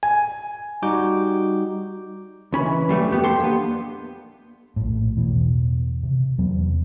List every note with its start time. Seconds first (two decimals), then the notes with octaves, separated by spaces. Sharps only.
0.03 G#5
0.82 G3 D#4 F#4 D6 G6
2.53 C#2 E3 C#4 B5
2.89 F#3 G3 A3
3.11 F2 B3 G4
3.24 A4 C6
3.40 A#3 B3 D4
4.76 A#1 A2
5.16 E2 B2 E3
6.03 C3
6.38 E2 F#3 B3